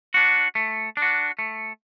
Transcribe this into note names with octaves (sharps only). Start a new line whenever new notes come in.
D4 F#4
A3
D4
F#4
A3